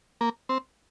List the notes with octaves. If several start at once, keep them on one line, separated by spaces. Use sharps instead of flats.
A#3
C4